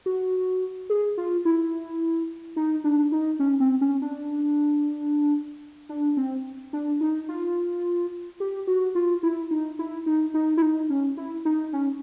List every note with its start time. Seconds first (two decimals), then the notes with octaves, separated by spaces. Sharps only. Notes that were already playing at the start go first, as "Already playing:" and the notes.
0.06 F#4
0.90 G#4
1.17 F4
1.45 E4
2.56 D#4
2.84 D4
3.12 D#4
3.39 C#4
3.60 C4
3.81 C#4
4.02 D4
5.89 D4
6.17 C4
6.73 D4
7.01 D#4
7.29 F4
8.40 G4
8.67 F#4
8.95 F4
9.23 E4
9.51 D#4
9.79 E4
10.06 D#4
10.34 D#4
10.57 E4
10.62 D#4
10.90 C#4
11.17 E4
11.45 D#4
11.73 C#4